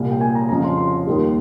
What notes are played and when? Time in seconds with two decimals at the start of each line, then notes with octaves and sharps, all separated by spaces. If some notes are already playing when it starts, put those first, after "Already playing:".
Already playing: C2 A#2 G3
0.11 G5
0.21 G#5
0.35 A#5
0.49 F2 C#3 F3 A#5
0.64 C6
0.78 C6
1.07 D#2 D#3 G3